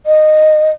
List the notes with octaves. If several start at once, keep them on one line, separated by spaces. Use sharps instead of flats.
D#5